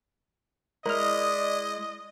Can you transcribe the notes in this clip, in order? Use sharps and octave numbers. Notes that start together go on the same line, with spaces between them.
G#3 E4 A#4 D5 D#5 F6